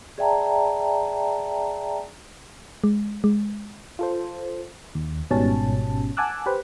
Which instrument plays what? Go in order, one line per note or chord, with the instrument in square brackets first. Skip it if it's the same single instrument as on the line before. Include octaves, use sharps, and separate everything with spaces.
[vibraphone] G#4 D5 E5 G5 A5 A#5
[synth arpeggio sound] G#3
G#3
[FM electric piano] F4 A4 C5
D#2
G#1 G#2 B2 G3 C#4 A5
F#5 G#5 A5 D6 E6 F#6
G4 B4 C5